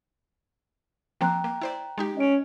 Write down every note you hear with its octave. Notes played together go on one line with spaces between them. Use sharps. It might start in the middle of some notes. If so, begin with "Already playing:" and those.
F3 A#3 C4 G5 A#5 F#6
A#3
E4 C5 D5
G#3 D#4 G4
C#4 D#5 D7